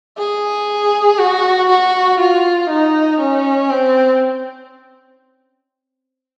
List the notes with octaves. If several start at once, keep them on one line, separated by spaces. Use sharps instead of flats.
G#4
F#4
F#4
F4
D#4
C#4
C4